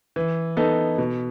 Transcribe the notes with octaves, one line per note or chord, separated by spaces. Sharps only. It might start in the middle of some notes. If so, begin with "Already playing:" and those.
E3
B3 D#4 A4
B2